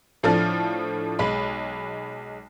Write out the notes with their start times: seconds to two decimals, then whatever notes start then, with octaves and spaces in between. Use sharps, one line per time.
0.23 A2 F3 D4 A4 F6 A6
1.19 B1 G#3 B5